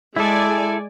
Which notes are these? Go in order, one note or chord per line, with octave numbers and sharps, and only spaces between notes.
G#3 E4 A4 D5 G#5